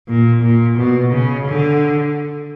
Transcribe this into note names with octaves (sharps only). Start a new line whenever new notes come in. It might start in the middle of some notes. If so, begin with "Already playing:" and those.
A#2
A#2
B2
C#3
D3